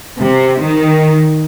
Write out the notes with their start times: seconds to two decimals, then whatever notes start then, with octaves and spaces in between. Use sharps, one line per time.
0.20 C3
0.61 D#3